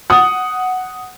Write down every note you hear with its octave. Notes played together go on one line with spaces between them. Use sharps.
F#5 D#6